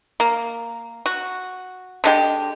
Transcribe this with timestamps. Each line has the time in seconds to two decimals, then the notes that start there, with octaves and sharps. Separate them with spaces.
0.20 A#3
1.06 F#4
2.04 D3 G#3 G4